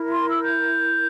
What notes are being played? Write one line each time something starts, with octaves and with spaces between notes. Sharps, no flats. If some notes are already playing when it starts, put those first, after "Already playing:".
Already playing: E4 A#4
C6
E6
G6